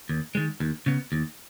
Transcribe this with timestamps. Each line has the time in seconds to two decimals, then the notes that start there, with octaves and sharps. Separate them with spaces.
0.09 D#2
0.35 D#3 G#3
0.60 D#2
0.86 C#3 B3
1.12 D#2